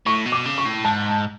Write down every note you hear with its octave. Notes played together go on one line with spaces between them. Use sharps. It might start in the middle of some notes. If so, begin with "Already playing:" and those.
A2 C#6
B2
D6
C#3
C#6
A2
G#2 A5